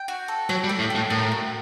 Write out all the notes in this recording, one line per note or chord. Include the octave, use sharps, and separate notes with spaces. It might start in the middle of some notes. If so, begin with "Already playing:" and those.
Already playing: G5
F#4
A4
F#3 G5
G3
A4
A2
G5
A2
A2 A#4
F#4